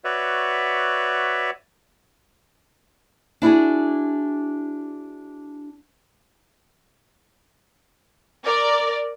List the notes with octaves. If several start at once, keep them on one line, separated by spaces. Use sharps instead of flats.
F#4 B4 C#5 D5 E5
D4 E4 F#4 G#4
A#4 D5